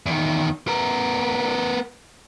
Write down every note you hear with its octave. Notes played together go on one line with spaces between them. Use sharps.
E2 D#3
B3 A#4